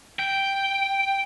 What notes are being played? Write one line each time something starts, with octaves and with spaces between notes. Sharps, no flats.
G5